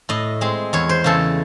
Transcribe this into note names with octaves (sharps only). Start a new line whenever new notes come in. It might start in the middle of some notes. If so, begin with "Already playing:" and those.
A2 D#5
G#3 C4
E2 C#5
C5
C#3 E3 A3 A4